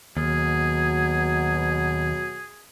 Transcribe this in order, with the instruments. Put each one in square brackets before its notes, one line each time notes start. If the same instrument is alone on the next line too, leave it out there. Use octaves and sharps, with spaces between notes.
[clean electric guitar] D#2 [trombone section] B2 F#3 [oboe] G#4